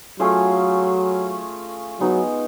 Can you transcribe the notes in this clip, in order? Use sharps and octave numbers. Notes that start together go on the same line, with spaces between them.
F#3 A3 C#4 F4 G#4
F#3 G#3 B3 D#4